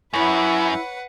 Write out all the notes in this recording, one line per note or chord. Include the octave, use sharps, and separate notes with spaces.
F#2 E4 B4 C#5 F#5 B5